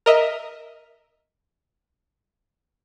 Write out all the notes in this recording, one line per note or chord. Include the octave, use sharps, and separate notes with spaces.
A#4 D#5 E5